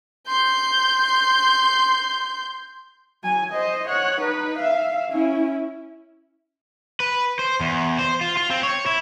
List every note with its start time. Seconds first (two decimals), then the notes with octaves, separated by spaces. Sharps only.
0.28 C6 G6
3.23 F#3 G#5
3.52 C5 D#5
3.87 C#5 F#5
4.20 D#4 B4
4.58 E5 F5
5.12 C#4 E4
7.00 B4
7.39 C5
7.60 E2
7.99 C5
8.21 F4
8.37 F4
8.50 C4
8.63 C#5
8.86 E4